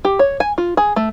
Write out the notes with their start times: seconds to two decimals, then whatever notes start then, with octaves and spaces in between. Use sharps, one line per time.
0.05 G4
0.19 C#5
0.40 G#5
0.58 F4
0.77 G#4
0.96 A3